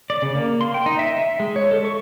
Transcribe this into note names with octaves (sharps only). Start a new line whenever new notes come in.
D5
C#3
A#3
C6
G5
D#4
E5
E5
G#3
C#5
A4
C#6